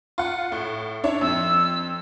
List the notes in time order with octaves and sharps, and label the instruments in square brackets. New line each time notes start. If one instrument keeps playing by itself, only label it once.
[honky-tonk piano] F4 F#5
A2
D4 E4 C#5
[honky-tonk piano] F2 [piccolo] E6